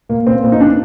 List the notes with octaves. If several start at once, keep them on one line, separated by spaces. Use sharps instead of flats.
A#2 A#3
A#2 C4
A#2 C4
D#4
D4